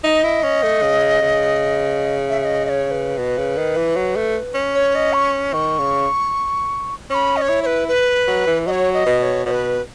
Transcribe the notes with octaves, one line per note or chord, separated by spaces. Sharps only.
D#4 D#5 E5
E4
C#4
A3
C#3
C#3
E5
E5
D#5
D#5
C#5
B4
B2
C#3
D#3
E3
F#3
A3
C#4
C#5
D#5
C#6
D#3 C#6
C#3
C#4 B5 C#6
D#5
C#5
E4
C#5
B4
B4
F#3
E3
F#3 C#5 D#5
D#5
B2
D#5
C#5
B2 C#5
B4